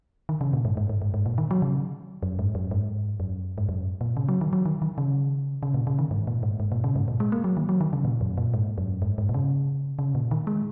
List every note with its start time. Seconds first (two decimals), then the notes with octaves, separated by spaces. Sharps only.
0.29 D#3
0.41 C#3
0.53 A#2
0.65 G#2
0.77 G#2
0.89 G#2
1.02 G#2
1.14 G#2
1.26 A#2
1.38 D#3
1.51 F#3
1.62 C#3
2.23 F#2
2.39 G#2
2.55 F#2
2.71 G#2
3.20 F#2
3.58 G#2
3.69 F#2
4.01 A#2
4.17 C#3
4.29 F#3
4.41 D#3
4.53 F#3
4.66 D#3
4.82 D#3
4.98 C#3
5.63 C#3
5.74 A#2
5.87 C#3
5.99 D#3
6.11 G#2
6.27 A#2
6.43 G#2
6.60 G#2
6.72 A#2
6.84 C#3
6.96 G#2
7.08 A#2
7.20 G#3
7.32 A#3
7.44 F#3
7.57 D#3
7.69 F#3
7.81 D#3
7.93 C#3
8.05 A#2
8.21 F#2
8.38 A#2
8.54 G#2
8.78 F#2
9.02 G#2
9.18 G#2
9.29 A#2
9.34 C#3
9.99 C#3
10.15 A#2
10.31 D#3
10.47 G#3